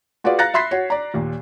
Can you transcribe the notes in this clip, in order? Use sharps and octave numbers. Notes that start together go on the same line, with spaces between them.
F4 F#4 G#4 B4 D5 F5
F5 A#5 F#6 A6 A#6 C#7
E5 B5 C6 B6 C7
F#4 C#5
D5 A#5
D#2 A#2